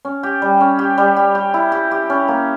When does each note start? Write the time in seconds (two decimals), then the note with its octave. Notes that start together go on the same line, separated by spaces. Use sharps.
0.05 C#4
0.23 G4
0.42 G3
0.60 C#4
0.79 G4
0.98 G3
1.16 G4
1.35 G4
1.54 E4
1.72 G4
1.91 G4
2.10 C#4
2.28 A#3